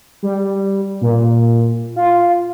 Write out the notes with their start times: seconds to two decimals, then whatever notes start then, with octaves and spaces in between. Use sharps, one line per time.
0.23 G3
1.01 A#2
1.96 F4